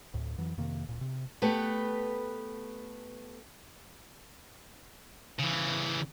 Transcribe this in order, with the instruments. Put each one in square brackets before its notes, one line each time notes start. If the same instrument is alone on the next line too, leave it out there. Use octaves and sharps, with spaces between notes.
[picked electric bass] D2 A2
F2 E3 F#3
F2 C3 D#3 A#3
D1 A#2
C3
[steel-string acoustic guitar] A3 B3 G4 B4
[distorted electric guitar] C#3 E3